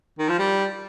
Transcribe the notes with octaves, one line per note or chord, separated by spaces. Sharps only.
D#3
F3
G3